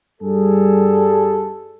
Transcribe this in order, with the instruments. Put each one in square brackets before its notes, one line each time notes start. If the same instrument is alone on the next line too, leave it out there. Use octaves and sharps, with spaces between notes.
[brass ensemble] G2 G3 G#4 A4